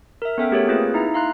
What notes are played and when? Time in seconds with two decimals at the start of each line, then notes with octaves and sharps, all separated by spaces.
0.22 A#4 E5
0.38 B3 C#4 A4 E5 G5
0.51 A3 G4 G#4 A#4 C#5
0.68 A#3 C4 F4 G#4 B4
0.94 D#4 E4 E5 A#5
1.14 F5 A#5 C6 F#6